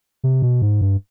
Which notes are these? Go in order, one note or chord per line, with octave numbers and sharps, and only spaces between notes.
C3
B2
G#2
G2